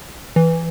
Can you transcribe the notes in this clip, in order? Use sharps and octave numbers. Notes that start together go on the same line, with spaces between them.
E3